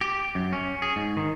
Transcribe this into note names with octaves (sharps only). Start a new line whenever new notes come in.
G4
F#2
C#4
G#4
G#2
D#3